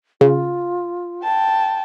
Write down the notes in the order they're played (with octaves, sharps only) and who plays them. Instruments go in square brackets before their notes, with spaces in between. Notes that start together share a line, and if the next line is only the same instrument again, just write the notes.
[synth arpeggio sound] C#3 [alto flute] F4
[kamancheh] G5 A5